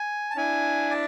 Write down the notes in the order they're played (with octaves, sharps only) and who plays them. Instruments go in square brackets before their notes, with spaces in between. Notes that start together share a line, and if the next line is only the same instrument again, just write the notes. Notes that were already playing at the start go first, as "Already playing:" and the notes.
Already playing: [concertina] G#5
A5
[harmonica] D4 E4 [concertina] G#5
[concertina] D5